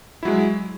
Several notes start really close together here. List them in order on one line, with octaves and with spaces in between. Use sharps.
E4 F#3 G#3